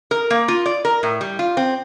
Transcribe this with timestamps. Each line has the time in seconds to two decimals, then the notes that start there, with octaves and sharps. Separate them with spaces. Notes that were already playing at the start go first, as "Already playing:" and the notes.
0.11 A#4
0.30 A#3
0.48 F4
0.66 D5
0.85 A#4
1.03 A2
1.21 G3
1.39 F4
1.57 C4